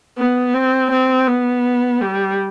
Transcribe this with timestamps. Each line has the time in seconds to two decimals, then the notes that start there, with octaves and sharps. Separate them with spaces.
0.18 B3
0.54 C4
0.91 C4
1.27 B3
2.01 G3